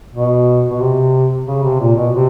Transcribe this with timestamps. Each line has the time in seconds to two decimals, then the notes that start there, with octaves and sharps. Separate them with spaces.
0.14 B2
0.70 B2
0.81 C3
1.47 C#3
1.63 C3
1.80 A#2
1.96 B2
2.14 C3